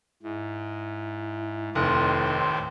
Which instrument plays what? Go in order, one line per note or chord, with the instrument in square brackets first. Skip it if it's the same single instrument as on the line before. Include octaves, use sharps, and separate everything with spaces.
[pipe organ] G#2 [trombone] E4
[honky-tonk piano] F1 [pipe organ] D#2 A2 C4 [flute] C6